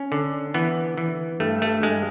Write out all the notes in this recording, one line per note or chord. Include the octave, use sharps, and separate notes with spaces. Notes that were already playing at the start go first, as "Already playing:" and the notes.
Already playing: C#4
D3
E3 B3
E3
G2 A3
A3
G2 G#3